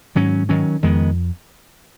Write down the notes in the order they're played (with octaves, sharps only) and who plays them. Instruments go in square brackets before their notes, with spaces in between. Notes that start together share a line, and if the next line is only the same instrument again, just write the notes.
[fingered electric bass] G#2 [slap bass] D#3 F#3 C#4
[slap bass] D#3 F#3 C#4
[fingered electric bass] F2 [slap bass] D#3 G#3 B3